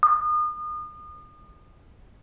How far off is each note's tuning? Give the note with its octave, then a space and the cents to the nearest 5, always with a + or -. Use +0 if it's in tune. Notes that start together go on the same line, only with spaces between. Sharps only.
D#6 -35